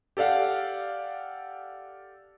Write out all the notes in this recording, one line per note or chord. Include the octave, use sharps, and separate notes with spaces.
G4 A4 D5 F5 F#5